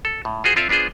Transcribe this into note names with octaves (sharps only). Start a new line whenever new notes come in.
A4
A2
F4 F#4 G#4 C5
C4 F4 A4 D5 E5 F5
B3 D4 F4 G#4 C5